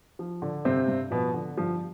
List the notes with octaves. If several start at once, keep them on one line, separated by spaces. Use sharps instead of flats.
F3
D3
G2 C3 C4
G2
B2 F3 B3
D3
G2 F3